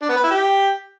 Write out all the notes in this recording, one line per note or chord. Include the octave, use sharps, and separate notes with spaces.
D4
B3
B4
E4
G4